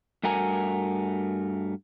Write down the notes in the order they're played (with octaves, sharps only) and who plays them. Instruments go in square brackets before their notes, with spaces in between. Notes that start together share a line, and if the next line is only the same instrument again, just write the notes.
[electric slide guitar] G2 A3 F#4 A#4 G#5